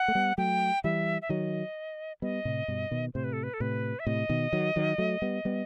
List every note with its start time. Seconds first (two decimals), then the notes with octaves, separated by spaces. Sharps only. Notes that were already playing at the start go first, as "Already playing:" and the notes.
Already playing: F#5
0.08 A3
0.15 G3 B3
0.38 F#3 A3 G5
0.84 E3 G3 E5
1.22 E5
1.29 D#3 F#3 D#5
2.22 G3 B3 D#5
2.45 A2 C3
2.68 G2 B2
2.91 B2 D#3
3.14 A2 C3 C5
3.24 B4
3.33 A4
3.43 B4
3.54 A4
3.60 A2 C3 B4
3.99 E5
4.06 A2 C3 D#5
4.29 B2 D#3
4.52 D#3 F#3
4.76 D#3 F#3
4.98 F#3 A3
5.22 G3 B3
5.45 G3 B3